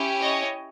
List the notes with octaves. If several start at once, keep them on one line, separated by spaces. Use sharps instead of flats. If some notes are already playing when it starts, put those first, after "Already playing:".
Already playing: C#4 E4 G4
C#5 D#5